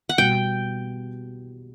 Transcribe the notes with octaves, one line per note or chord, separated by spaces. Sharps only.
F#5
B2 G3 B3 F#4 G5